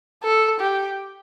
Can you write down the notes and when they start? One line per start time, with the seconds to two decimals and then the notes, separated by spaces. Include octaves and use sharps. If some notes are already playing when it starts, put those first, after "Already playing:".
0.23 A4
0.60 G4